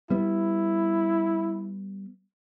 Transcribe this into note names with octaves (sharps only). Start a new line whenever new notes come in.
G3 B3 E4